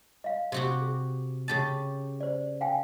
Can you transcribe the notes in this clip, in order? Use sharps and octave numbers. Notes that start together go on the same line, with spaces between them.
D#5 F5
C3 F#4 G4
G#4
C#3 G4 A5
C5 D5
F5 G5 G#5